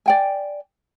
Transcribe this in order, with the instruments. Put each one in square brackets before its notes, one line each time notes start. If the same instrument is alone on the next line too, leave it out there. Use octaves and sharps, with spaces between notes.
[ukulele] D5 G5 G#5